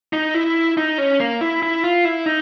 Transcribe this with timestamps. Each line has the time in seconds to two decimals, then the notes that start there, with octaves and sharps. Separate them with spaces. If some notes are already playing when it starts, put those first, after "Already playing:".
0.13 D#4
0.34 E4
0.77 D#4
0.98 C#4
1.20 A#3
1.41 E4
1.63 E4
1.84 F4
2.05 E4
2.26 D#4